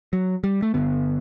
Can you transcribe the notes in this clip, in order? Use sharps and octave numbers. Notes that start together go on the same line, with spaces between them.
F#3
G3
A3
G1 G2 D3 B3